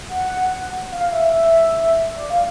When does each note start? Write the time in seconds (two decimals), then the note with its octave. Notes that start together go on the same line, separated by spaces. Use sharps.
0.09 F#5
0.91 F5
1.12 E5
1.34 E5
2.16 D5
2.30 F5